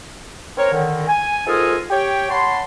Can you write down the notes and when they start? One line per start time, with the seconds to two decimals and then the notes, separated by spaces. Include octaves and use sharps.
0.58 C4 D#4 A#4 C#5
0.72 D3 D#3
1.08 G#5
1.47 G#2 F4 A4 A#4 G#5 D#6
1.91 G4 C#5 G5
2.30 C#5 F#5 A5 B5 C6